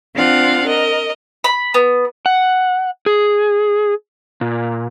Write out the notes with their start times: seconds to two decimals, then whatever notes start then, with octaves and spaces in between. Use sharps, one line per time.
0.14 C4 D4 F4 F5 F#5
0.67 A#4 D#5
1.44 B5
1.74 B3
2.26 F#5
3.06 G#4
4.41 A#2